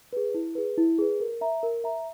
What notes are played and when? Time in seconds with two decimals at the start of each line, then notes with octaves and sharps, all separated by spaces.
0.13 G#4 B4
0.34 E4
0.55 G#4 B4
0.78 E4
0.98 G#4 B4
1.20 A#4
1.41 E5 A#5
1.63 A#4
1.84 E5 A#5